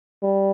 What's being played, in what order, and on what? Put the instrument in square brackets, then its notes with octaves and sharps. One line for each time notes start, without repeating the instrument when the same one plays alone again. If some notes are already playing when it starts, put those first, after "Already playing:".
[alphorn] G3